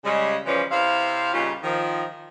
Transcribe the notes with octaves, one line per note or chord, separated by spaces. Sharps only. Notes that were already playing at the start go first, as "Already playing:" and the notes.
C#3 G3 G#3
C#3 E3 F3 G3 B3 C#4
C3 E4 C5 F5
A#2 C#3 G3 C#4 D#4 F4
D#3 F3